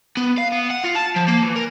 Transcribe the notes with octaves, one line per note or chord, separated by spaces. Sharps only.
B3
F5
B3
F#5
F4
A5
F3
A#3
E3
A#4